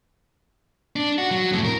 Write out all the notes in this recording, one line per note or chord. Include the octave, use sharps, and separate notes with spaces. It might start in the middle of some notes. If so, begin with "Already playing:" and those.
D4
F#4
F#3
F2 A2
A#4